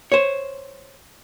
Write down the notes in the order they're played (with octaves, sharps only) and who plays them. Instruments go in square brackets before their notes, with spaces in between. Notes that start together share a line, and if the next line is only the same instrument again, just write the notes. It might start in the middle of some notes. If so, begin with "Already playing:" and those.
[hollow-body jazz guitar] C5 C#5